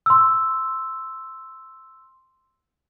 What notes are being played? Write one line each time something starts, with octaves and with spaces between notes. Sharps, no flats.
C6 E6